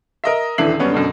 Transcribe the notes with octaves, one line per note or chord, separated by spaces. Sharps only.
A#4 D#5 E5
D#1 D3 E3 E5 C7 F#7
F#2 G3 B3 C#4
F#2 B2 D3